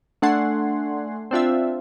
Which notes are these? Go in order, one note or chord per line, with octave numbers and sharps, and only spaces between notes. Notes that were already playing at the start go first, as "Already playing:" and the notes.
A3 D4 F#5 G#5 C6
C4 D4 F4 E5